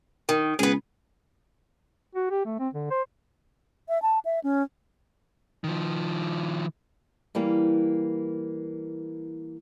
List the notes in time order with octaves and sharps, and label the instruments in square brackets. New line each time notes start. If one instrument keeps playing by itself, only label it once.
[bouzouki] D#3
[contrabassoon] C#2 [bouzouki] B3 G#4
[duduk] F#4
G4
A3
C4
D3
C5
[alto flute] E5
A5
E5
C#4
[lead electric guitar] D#3 F3
[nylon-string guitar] E3 G3 A#3